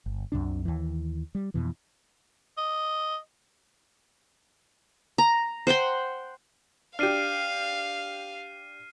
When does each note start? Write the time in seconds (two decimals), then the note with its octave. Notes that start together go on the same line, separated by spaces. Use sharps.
0.06 G1
0.32 C2 F#2 C3 D4
0.65 D#2 E3
1.35 G3
1.54 F2 B2 E3
2.57 D#5
5.18 A#5
5.67 C5 F#5 G5 C6
6.99 D4 G4 F5 F6 C7 D#7